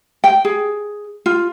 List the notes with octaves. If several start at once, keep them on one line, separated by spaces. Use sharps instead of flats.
G5
G#4
F4